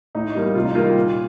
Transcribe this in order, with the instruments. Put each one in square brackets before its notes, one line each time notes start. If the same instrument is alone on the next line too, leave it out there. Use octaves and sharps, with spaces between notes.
[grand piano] A2 D#4
G3 A#3
C3 F4
D#4
D#3 G3 A#3 F4
A#2